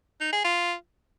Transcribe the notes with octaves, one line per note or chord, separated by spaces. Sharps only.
D#4
G#4
F4